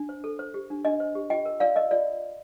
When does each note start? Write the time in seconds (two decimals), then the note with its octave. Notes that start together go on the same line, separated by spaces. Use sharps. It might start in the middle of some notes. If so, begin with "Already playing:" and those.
Already playing: D4
0.09 C5
0.24 A4
0.39 C5
0.54 G4
0.70 D4
0.85 D4 D#5
1.00 C5
1.15 G4
1.30 F4 D#5 G5
1.45 A#4
1.60 F4 D5 F5
1.76 A#4 D#5
1.91 F4 D5